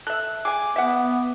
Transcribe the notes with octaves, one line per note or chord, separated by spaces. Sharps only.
A4 E5 F#6
G#4 G#5 D6
B3 E5 F#5